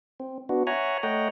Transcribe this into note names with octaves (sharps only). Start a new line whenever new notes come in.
C4
B3 D4 F#4
C#5 E5 F#5 G#5 A#5
A3 C#5 D#5 F#5 G5 A#5